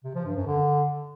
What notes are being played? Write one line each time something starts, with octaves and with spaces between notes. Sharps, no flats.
C3
F3
G2
F#2
D3